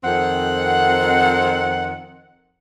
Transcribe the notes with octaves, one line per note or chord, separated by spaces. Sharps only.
F2 D#3 C4 F#5